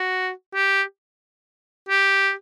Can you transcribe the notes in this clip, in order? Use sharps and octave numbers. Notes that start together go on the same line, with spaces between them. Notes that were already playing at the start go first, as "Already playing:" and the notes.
Already playing: F#4
G4
G4